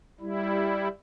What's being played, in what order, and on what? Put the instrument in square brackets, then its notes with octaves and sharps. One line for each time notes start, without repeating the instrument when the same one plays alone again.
[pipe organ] G3 E4